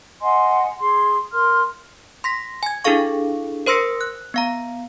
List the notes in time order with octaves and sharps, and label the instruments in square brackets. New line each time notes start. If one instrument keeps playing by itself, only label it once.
[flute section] D#5 F#5 G#5 C6
G#4 C6
A#4 C6 F6
[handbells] C6 A#6 B6
G#5 G#6
D4 E4 G#4 A4 F5 C#6
A#4 C5 C6 E6 A#6 C#7
F#6
B3 F5 A#5